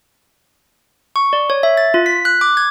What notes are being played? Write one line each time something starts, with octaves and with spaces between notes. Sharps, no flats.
C#6
D5
C#5
E5
A6
F4
B6
F#6
D6
G#6